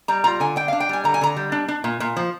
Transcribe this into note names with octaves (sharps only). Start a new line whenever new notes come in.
G3 A#5
F4 A#5
D3 G#5
D4 G5
D4 F5
G5
G3 G#5
D3 A#5
G#5
D3 A#5
G3
D4
D4
A#2
A#2
F3